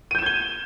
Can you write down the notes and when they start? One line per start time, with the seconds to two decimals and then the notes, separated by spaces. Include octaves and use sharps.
0.11 D#7
0.15 G6
0.19 E7
0.22 G#6
0.26 G7